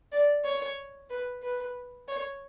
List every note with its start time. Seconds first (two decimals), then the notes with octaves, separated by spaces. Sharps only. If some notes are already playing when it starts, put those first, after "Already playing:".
0.12 D5
0.44 C#5
1.10 B4
1.42 B4
2.08 C#5